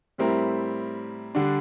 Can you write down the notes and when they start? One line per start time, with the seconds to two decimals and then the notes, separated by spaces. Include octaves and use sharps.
0.18 A2 G3 C4 E4 A#4
1.35 D3 G3 D4